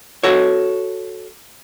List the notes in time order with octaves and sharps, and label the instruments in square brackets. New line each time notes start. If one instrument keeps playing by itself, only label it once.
[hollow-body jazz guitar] F#4 A4 C#5